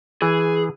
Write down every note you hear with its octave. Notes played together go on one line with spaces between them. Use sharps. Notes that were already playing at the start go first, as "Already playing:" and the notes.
E3 G#4